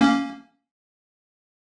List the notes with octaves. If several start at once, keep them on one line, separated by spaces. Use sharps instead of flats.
A#3 C#4